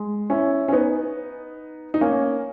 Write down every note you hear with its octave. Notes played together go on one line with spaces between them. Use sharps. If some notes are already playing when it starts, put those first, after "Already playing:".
Already playing: G#3
C#4 E4
C#4
B3 D#4
D#4
A#3 C#4